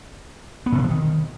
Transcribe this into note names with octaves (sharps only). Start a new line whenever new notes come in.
B3
A#2
C3
F3
D#3